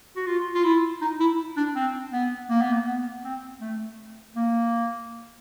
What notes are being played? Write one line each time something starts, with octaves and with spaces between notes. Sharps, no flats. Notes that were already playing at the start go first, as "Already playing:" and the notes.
F#4
F4
F4
E4
D#4
E4
D4
C4
B3
A#3
B3
A#3
B3
C4
A3
A#3